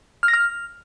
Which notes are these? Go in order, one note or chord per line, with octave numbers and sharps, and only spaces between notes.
F6
A#6
F6